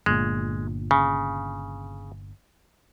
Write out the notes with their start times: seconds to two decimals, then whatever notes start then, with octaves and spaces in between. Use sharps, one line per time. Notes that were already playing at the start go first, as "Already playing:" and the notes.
0.06 G1 A#2 G#3
0.91 C#3